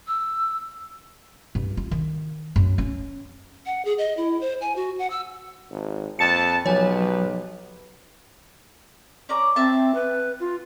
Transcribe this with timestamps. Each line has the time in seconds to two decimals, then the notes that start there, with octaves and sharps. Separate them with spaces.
0.07 E6
1.55 G2
1.77 F4
1.91 D#3
2.56 F#2
2.78 C#4
3.66 F#5
3.85 G#4
3.98 D#5
4.17 E4
4.41 C5
4.61 G#5
4.76 F#4
4.99 F#5
5.10 E6
5.70 G#1
6.19 F2 A#2 A5 C#7
6.66 B1 F3 F#3 G4 B4 C#5 G#5
9.29 C#4 D5 A#5
9.56 C4 E5 A5
9.95 B4
10.40 F4